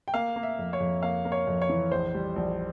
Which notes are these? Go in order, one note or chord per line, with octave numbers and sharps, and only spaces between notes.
G5
A#3 F5
A#3
E5
F2
C#5
F2
A#3 F5
A#3
C#5
F2
C#5
E3
A#1 C5
G3
A#1